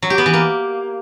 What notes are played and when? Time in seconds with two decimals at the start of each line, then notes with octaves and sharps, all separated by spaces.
0.02 F#3
0.10 G4
0.18 B3
0.26 E3
0.34 A#3